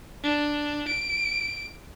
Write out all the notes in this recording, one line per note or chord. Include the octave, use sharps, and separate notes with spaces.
D4
D7